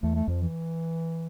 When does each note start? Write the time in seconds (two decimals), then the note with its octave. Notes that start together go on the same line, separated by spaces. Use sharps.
0.03 E2 A3
0.15 A3
0.28 F2 F3
0.41 E3